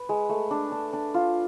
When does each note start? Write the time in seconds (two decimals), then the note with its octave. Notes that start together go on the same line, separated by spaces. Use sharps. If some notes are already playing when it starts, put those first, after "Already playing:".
Already playing: B4
0.09 G#3
0.29 A3
0.51 D4
0.72 D4
0.93 D4
1.14 F4